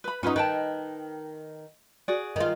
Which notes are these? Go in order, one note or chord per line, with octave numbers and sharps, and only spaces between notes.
B4 B5
C#4 D#4 F4 B4 F#5
D#3 B4 G5 A5
F#4 G#4 D5
D#3 F4